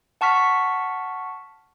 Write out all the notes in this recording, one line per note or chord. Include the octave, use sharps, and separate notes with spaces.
F#5 A5 C#6 F6 B6